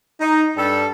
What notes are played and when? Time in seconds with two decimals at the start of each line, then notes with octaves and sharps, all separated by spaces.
0.21 D#4
0.57 G2 G3 A4